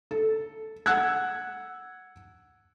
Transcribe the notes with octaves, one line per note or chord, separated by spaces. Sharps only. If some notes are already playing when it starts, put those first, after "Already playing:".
A4
F#5 E6 F#6 G#6